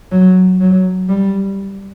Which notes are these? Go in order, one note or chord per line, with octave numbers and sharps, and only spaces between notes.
F#3
F#3
G3